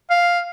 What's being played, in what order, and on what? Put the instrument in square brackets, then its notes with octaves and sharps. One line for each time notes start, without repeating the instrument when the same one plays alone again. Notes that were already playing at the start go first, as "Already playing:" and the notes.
[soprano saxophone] F5